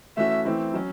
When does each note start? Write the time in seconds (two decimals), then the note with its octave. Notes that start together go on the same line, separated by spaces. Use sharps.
0.17 E3 A3 C#4 F#4 E5
0.45 E3 A3 C4 E4
0.73 F#3 C#4